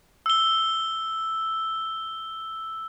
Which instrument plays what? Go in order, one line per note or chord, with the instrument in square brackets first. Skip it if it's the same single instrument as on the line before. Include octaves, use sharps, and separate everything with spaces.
[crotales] E6 G7